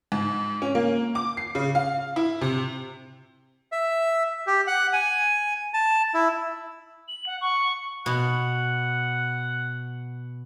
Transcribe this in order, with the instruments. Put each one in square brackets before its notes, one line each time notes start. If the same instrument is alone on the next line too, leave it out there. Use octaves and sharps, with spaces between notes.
[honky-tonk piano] G#2
C#4
A#3
D6
C7
C#3
F5
E4
C3
[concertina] E5
G4
F#5
G#5
A5
E4
[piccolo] F#7
F#5
C#6
[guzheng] B2 [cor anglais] F#5